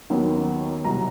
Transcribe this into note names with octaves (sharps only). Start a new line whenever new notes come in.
D#2 D#3 F#3 B3
C2 B2 F#3 A#5